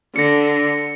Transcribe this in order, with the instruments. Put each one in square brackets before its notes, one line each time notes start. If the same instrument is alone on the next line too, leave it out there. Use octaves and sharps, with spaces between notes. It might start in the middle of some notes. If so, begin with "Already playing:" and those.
[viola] D3 [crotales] A#6 C#7